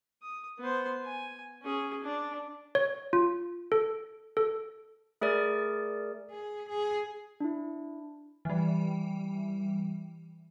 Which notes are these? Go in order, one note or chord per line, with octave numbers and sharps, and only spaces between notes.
D#6
B3 C5
G#5
C#4 G#4
D4
C#5
F4
A4
A4
A3 G#4 A#4 D5
G#4
G#4
D4 E4
E3 G3